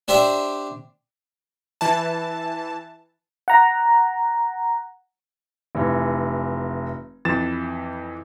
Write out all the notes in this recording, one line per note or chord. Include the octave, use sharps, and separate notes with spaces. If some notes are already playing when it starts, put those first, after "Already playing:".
D4 G4 C5 D5 E5
E3 A5
F#5 A#5
F1 E3
F2 E3 A6 E7